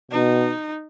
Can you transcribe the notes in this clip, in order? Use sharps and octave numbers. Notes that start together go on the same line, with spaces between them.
B2 D#4